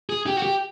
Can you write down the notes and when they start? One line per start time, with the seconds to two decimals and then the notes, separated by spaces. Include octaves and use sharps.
0.09 G#4
0.27 G4
0.38 F#4
0.42 G4